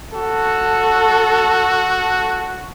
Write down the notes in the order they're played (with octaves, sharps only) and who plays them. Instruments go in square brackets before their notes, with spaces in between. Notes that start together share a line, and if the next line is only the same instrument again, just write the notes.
[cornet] F#4 [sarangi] A4